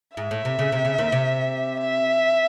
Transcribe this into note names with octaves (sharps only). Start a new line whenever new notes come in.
G#2 E5
A2
C3
C#3
C3
C#3
D#2 D#3
C3
E5